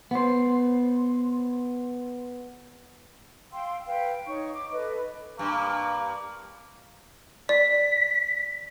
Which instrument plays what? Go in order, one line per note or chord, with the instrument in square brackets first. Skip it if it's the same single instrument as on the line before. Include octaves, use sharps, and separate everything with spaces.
[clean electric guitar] B3 C5
[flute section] F5 G5 C6 E6
B4 F5 G5
D#4 C#5 C#6
D6
A4 B4 D#5
[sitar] G2 [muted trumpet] A#3
[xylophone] D5 [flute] B6